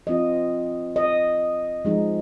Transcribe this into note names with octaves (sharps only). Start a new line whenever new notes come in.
F3 C4 F4 D#5
D#5
F3 G#3 D#4